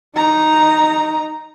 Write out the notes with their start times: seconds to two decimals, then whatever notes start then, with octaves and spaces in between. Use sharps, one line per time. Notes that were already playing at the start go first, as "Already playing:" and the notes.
0.16 D#4 A#5